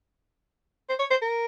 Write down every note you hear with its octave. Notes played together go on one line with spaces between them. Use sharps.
C5
C#5
C5
A#4